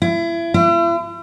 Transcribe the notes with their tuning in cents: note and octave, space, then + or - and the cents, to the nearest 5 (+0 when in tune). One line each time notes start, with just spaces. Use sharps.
E4 +30
E4 +45